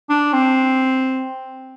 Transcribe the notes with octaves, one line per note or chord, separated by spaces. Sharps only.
D4
C4